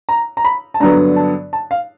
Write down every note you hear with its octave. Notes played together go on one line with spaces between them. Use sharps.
A#5
A#5
B5
A5
G2 D3 F#3 B3 A#5
A5
A5
F5